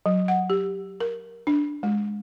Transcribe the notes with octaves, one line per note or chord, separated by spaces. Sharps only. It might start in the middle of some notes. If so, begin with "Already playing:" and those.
F#3
F#5
G4
A#4
D4
G#3